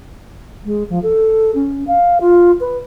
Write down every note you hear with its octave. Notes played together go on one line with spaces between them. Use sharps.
G#3
F3
A4
C#4
F5
F4
B4